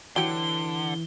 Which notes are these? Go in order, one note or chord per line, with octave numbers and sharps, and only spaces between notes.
D3 E3 F#3 G4 G7